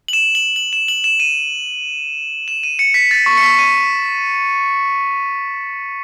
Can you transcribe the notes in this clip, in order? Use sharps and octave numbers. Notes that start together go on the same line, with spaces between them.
F#7
E7
F#7
F#7
E7
F#7
E7
D#7
E7
D#7
C#7
B6
A6
C#6
C#7
B6
D#7